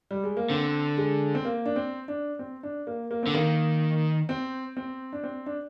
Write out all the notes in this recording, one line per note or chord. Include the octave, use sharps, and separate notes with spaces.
G3
G#3
A#3
D3 C4
G#3
C4
A#3
D4
C4
D4
C4
D4
A#3
A#3
D3 C4
D#3 A#3
C4
C4
D4
C4
D4